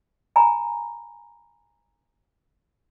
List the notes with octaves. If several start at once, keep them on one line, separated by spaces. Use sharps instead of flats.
G#5 A#5 B5